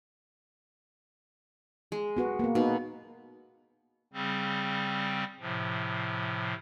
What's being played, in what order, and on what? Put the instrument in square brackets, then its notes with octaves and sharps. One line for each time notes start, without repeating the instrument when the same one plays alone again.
[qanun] G#3
[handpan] B3 F#4 B4
A#3 B3
[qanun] B2 [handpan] D#4 F#4 B4
[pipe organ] C#3 G3 C4
A2 C3 F3